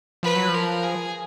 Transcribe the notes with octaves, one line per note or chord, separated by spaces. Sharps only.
F3 B4
F#3
F3
A#4
G#4